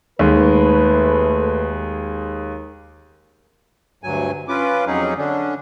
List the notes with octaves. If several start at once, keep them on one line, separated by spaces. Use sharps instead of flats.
D#2 G#3 A3 B4
D2 G2 F#3 G#5
C#4 F4 B4 D6
F2 F#3 C#4 D#4 G#4
D3 C#4 D4